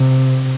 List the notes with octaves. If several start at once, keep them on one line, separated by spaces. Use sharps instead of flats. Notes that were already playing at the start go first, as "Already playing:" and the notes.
Already playing: C3